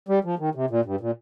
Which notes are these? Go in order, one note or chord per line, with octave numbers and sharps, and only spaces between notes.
G3
F3
D#3
C3
A#2
G2
A#2